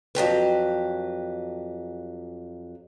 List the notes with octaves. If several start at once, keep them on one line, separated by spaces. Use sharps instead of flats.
F2 F#3 G4 B4